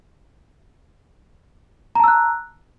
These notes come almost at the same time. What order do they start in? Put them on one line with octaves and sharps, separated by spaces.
A#5 A5 E6 F#6